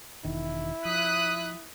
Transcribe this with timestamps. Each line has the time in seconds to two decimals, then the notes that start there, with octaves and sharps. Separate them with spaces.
0.24 E1 D#3 E4
0.85 F3 D#6 F#6 B6